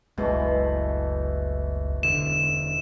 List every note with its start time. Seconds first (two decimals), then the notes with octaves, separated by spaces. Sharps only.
0.18 F#1 C#2 B2 E3 G#3 A3
2.03 E1 D3 E5 E7